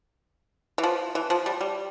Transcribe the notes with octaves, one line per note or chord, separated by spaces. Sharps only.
E3
F3
E3
F3
G3
G3